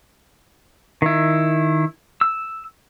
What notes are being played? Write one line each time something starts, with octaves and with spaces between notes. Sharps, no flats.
D#3 E4
E6